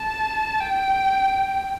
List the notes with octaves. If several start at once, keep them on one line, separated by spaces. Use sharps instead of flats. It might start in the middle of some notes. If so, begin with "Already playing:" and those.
Already playing: A5
G5